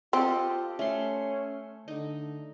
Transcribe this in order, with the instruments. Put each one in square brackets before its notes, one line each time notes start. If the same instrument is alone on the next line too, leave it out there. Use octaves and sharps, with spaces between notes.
[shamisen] C4 [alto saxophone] F4 [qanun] G4 A4 D#5
[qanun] A3 C6 [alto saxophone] C#4
[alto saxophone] D3 [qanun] D#4